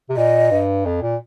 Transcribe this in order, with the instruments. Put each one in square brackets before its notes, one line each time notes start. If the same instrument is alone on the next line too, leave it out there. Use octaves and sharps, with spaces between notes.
[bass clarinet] C3
[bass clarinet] A#2 [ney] D#5
[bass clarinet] G2
F2
A#2